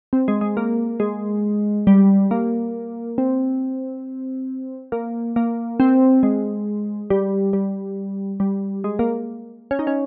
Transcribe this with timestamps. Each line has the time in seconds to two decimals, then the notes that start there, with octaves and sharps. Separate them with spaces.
0.13 C4
0.28 G#3
0.41 G#3
0.57 A#3
1.00 G#3
1.87 G3
2.31 A#3
3.18 C4
4.92 A#3
5.36 A#3
5.80 C4
6.23 G#3
7.10 G3
7.53 G3
8.40 G3
8.84 G#3
8.99 A#3
9.71 C#4
9.79 D#4
9.87 C#4